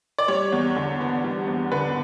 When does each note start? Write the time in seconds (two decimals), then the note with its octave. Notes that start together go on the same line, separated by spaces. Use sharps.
0.18 D5
0.28 G3 C#5
0.52 E2
0.76 D3
1.01 B3
1.24 G3
1.48 E2
1.72 D3 B4